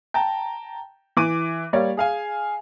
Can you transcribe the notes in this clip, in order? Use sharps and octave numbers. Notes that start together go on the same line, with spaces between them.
G5 A5 A#5
E3 D6 D#7
G3 A#3 C#5 D5
G#4 F5 G#5